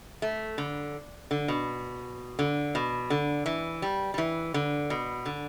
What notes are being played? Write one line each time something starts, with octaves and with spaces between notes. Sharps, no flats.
A3
D3
D3
B2
D3
B2
D3
E3
G3
G3
E3
D3
B2
D3